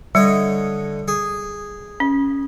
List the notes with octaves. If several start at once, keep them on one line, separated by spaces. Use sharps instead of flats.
D3 G3 C#5 D#5
G#4
C#4